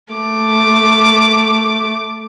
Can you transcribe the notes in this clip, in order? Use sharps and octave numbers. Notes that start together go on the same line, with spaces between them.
A3 D6